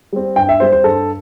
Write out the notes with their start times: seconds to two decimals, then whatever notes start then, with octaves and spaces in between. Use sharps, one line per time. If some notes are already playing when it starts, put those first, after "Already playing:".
0.13 G3 C4
0.36 G2 G5
0.49 E5
0.60 G3 C4 C5
0.72 C5
0.84 G2 A4